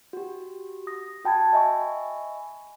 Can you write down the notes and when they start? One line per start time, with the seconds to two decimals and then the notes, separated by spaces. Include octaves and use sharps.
0.13 F#4 G4
0.87 D#6 A#6
1.25 F#4 G5 A5 B5 G#6
1.53 D#5 E5 G#5 B5 C#6